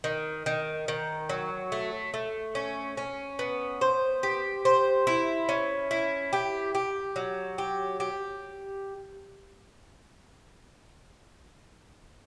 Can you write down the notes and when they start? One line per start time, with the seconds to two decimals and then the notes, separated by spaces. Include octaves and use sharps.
0.04 D#3
0.46 D#3
0.88 D#3
1.29 F#3
1.72 A3
2.14 A3
2.55 C#4
2.97 C#4
3.39 B3
3.81 C5
4.23 G4
4.65 C5
5.07 E4
5.49 C#4
5.91 E4
6.33 G4
6.75 G4
7.16 F#3
7.58 G4
8.00 G4